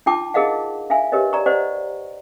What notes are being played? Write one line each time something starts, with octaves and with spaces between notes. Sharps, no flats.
D4 D#4 F4 G5 A5 D6
D#4 G#4 A#4 D#5 F5 F#5
D4 E5 F5 G#5
G4 A#4 B4 C#5 D#5
D5 A#5 C#6
C5 D5 D#5 F#5 C#6